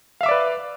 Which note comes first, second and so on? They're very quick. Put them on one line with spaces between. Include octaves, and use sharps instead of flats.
F5 E5 D6 D5 B4